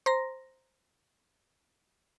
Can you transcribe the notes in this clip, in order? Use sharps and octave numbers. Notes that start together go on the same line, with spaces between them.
C5 A#5 C6 A#6